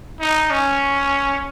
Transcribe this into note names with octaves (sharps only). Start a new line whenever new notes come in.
D#4
C#4